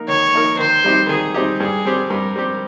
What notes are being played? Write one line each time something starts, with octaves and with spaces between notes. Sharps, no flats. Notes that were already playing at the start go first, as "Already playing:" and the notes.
Already playing: A#3 D#4 A#4
D#3 C#5
A#3 D#4 A#4
D#3 C5
G3 C4 D#4 G4
D#3 G#4
G3 C4 D#4 G4
G2 G#4
G3 C4 G4
G2 A#4
G3 C4 G4